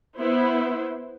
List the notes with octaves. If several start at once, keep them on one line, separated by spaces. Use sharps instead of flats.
B3 E4 C5